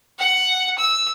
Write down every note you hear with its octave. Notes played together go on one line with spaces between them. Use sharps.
F#5
E6